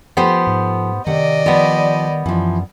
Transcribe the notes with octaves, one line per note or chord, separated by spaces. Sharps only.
F3 A3 B3 G4 C5
G#2
C3 D#3 D5 D#5 F#5
F3 G3 B3
F#2 E3 F3